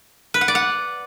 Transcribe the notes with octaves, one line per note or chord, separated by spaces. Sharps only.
B4
F#5
D5
F#5